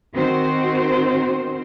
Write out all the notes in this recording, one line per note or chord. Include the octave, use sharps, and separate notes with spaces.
D#3 C4 F#4 C5